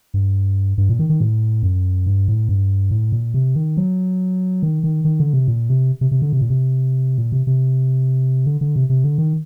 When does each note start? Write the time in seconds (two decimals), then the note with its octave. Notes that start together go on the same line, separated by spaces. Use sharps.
0.14 G2
0.78 G2
0.89 A#2
0.99 D#3
1.09 D#3
1.20 A2
1.63 F#2
2.06 G2
2.28 A2
2.49 G2
2.91 A2
3.12 A#2
3.34 C3
3.56 D#3
3.77 F#3
4.63 D#3
4.83 D#3
5.05 D#3
5.20 D3
5.33 C3
5.48 A#2
5.69 C3
6.01 C3
6.11 C3
6.22 D3
6.33 C3
6.41 A#2
6.50 C3
7.18 A#2
7.32 C3
7.47 C3
8.46 D3
8.61 D3
8.76 C3
8.90 C3
9.04 D3
9.18 D#3